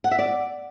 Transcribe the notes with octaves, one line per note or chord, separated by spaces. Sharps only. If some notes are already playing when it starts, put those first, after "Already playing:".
F#5
E5
D5